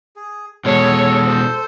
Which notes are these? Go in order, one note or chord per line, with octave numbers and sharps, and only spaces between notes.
G#4
B2 G#3 A4 C#5
C5